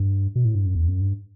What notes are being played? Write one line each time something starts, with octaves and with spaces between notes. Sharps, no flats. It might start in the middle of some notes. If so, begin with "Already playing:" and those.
Already playing: G2
B2
A2
G2
F#2
E2
F#2
G2